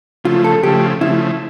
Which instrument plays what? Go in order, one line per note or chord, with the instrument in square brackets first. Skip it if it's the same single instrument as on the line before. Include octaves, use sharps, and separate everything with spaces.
[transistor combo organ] C#3 F3 A3 [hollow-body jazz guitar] F4
[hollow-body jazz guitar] A4
[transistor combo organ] C#3 F3 A3 [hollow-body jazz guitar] G4
[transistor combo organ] C#3 F3 A3 [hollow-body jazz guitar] E4